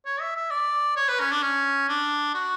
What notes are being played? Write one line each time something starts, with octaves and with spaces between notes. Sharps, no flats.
C#5
E5
E5
D5
C#5
B4
C#4
D4
C#4
D4
F#4